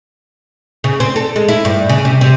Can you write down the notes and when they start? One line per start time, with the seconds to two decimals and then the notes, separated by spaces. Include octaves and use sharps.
0.84 C#3
1.00 C4
1.16 A4
1.36 G#3
1.48 E4
1.65 G2
1.89 C#3
2.05 C3
2.21 C3